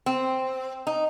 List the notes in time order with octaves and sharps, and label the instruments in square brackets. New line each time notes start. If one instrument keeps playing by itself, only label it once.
[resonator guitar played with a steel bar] C4
D#4